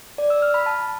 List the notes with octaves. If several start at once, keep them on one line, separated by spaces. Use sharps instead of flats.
D5
E6
F6
B5
A5